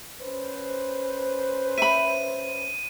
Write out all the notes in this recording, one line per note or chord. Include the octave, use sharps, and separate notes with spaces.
C#4 B4 C5
E5 B5 D#7